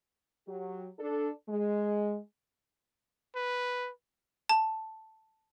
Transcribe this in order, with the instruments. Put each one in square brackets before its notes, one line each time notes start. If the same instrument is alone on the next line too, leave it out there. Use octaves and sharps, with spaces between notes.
[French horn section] F#3 G4
D4 A4
G#3
[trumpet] B4
[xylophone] A5